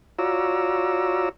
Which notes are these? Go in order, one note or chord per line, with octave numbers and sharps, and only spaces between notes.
F4 F#4 C#5 D5 A#5 E6